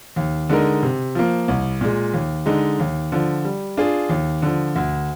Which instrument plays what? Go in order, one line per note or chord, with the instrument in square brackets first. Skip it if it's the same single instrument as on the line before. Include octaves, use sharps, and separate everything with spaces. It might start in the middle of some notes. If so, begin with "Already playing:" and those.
[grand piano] D#2
D3 G#3 D#4 A#4
C3
F3 A#3
C2
A#2 G#3
D#2
D3 G#3 D#4
D#2
D3 F3
G3
D4 F4 G#4
D#2
D3 F3
D2